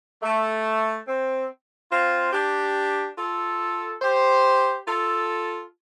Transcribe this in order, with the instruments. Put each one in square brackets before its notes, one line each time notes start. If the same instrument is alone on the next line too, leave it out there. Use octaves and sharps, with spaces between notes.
[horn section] A3
C4
C4 F4
D4 G4
F4 A4
G4 C5
F4 A4